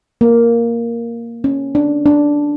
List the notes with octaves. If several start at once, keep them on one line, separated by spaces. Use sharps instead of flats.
A#3
C#4
D4
D4